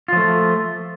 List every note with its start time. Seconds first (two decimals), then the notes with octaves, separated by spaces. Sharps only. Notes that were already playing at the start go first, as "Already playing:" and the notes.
0.08 F4
0.13 F3
0.17 A3